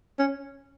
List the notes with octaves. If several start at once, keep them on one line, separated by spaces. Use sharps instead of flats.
C#4